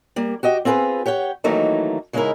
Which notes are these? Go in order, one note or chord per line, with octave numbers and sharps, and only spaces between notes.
G3 A#3
F#4 G4 D#5 G5
C4 F4 G#4 A#4 B4
G4 C#5 F#5 G5
D#3 E3 F#3 A3 A#3 D#4
C#3 G#3 C#4 D#4 E4 A#4